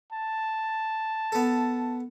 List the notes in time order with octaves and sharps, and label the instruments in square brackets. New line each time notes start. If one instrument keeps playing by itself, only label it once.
[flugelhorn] A5
[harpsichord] B3 A4